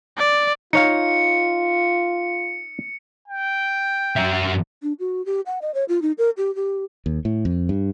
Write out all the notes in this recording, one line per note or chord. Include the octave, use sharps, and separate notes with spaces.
D5
D#4 F4 C#5 F5 C#7
G5
F#2 E5
D4
F#4
G4
F#5
D#5
C#5
F4
D#4
A#4
G4
G4
D#2
A2
F2
G2